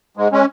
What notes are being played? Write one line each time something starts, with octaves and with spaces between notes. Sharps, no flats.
G#2 G#3
G#3 C#4